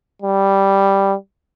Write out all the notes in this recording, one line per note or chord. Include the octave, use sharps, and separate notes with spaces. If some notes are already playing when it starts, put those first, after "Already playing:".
G3